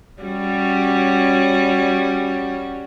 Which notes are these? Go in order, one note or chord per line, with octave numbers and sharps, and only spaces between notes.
G3 C#4 F#4